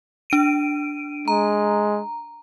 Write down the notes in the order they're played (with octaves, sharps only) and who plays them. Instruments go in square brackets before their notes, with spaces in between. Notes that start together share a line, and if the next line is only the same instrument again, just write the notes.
[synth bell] D4 D7 D#7
[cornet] G#3 [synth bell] A#5